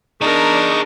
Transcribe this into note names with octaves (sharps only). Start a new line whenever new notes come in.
D4 D#4 G#4 A#4 D5 C#6